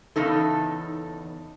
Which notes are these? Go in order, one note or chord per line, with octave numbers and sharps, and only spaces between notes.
E2 C#3 D#4 A4